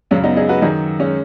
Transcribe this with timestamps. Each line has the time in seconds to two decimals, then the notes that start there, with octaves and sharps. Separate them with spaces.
0.11 F#2 C#3 G#3 C#4
0.24 B3 D#4
0.37 D#4 G#4
0.49 F#4 B4
0.62 F#2 D#3 D#4 G#4
1.00 G#3 C#4